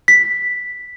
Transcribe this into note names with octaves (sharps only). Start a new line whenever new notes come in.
B6